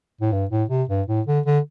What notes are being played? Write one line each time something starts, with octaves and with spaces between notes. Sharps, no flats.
A2
G2
A2
C3
G2
A2
D3
D3